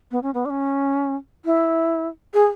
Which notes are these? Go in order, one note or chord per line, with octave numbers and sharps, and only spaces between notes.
B3
C#4
B3
D4
C#4
E4
G#4